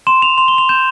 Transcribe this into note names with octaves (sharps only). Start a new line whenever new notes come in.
C6 E7
C6 F7
C6 F7
G7
C6 F7
G6 E7